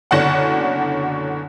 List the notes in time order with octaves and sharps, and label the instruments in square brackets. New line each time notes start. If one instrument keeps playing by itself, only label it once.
[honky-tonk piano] F#1 B2 D3 C#4 D4 F#5